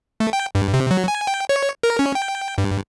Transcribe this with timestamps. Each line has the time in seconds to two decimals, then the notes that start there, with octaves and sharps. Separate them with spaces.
0.20 A3
0.33 G5
0.55 G2
0.73 C3
0.91 F#3
1.08 G#5
1.27 G5
1.49 C#5
1.83 A#4
1.99 C#4
2.15 G5
2.58 G2